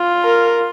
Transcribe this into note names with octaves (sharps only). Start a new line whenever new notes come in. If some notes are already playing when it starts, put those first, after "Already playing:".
Already playing: F4
A#4